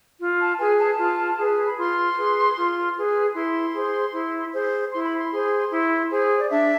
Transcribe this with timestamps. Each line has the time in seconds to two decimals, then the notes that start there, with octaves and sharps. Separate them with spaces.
0.20 F4
0.40 A5
0.59 G#4 B4 G#5
0.78 A5
0.98 F4
1.37 G#4 B4
1.68 B5
1.77 F4 C6
2.17 G#4 B4
2.57 F4
2.96 G#4 B4
3.34 E4 C6
3.74 G#4 C5
4.13 E4
4.53 G#4 C5
4.92 E4 C6
5.05 B5
5.18 C6
5.31 G#4 C5
5.71 E4
6.10 G#4 C5
6.39 D5
6.50 D4 E5